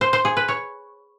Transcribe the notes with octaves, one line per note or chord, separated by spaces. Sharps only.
C5
C5
G#4
B4
C#5